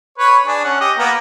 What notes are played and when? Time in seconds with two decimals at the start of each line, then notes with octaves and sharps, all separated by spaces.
0.18 B4 C#5
0.47 D4 G#4
0.64 C#4 F#5
0.81 G4 D#5
0.98 A#3 B3 A#4